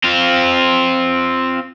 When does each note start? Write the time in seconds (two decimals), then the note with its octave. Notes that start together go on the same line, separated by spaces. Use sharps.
0.04 C4 F4